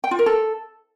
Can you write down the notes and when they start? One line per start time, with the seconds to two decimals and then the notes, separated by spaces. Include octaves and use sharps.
0.04 G5
0.11 F4
0.19 A#4
0.26 A4